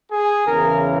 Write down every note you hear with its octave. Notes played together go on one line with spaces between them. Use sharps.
G#4
E2 C#3 E3 A#4